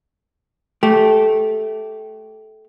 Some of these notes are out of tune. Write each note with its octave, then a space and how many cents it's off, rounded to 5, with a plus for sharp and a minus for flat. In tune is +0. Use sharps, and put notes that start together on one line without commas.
A3 -15 G4 -15